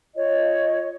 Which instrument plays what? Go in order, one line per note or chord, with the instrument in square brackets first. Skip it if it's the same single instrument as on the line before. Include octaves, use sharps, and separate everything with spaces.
[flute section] F4 C#5 D#5